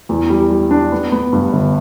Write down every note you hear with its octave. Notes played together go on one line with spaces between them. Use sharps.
E2
G3
G3
D4
B3
B3
G2
G1